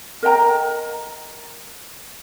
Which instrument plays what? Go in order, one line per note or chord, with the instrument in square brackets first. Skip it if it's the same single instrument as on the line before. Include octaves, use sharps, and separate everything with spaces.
[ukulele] A#4 D#5 G5 A#5